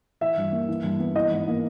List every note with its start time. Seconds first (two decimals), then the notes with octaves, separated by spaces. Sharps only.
0.21 E3 E5
0.37 G2
0.52 A#3
0.68 E3
0.84 G2
0.99 B3
1.15 E3 D#5
1.31 G#2
1.47 A#3